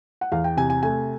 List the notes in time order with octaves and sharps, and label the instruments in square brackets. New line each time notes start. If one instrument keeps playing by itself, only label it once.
[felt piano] F#5
E2 F5
G5
C3 G#5
G#5
A3 G#5